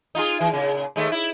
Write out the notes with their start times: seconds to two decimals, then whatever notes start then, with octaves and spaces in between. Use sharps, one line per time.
0.15 D#4 F4 G#4
0.40 E3
0.52 A#2 C#3
0.96 D#2 G#3 A3
1.12 E4